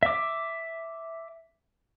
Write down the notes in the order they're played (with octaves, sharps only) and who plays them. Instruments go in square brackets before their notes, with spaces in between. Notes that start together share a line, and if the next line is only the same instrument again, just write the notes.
[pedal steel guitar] E5 D6